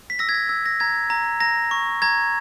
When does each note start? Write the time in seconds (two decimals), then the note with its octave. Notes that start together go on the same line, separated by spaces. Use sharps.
0.10 B6
0.19 E6 A#6
0.29 G#6
0.34 A#6
0.49 E6 G#6
0.66 A#6
0.80 A#5 G#6
1.10 A#5
1.40 A#5 A#6
1.71 C#6
2.02 A#5 G#6